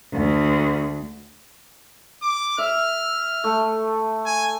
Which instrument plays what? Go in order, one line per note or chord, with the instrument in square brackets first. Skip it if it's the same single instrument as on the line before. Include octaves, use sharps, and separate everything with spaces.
[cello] D2
[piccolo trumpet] D6
[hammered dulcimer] E5 [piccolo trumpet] F6
[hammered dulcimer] A3
[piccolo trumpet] G#5